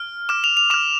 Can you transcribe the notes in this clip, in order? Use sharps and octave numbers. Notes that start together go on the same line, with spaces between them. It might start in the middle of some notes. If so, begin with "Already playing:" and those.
Already playing: F6
D6 F6 E7
F7
F7
D6 F6 E7